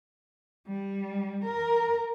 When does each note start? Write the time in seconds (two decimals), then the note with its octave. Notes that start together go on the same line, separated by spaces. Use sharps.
0.67 G3
1.44 A#4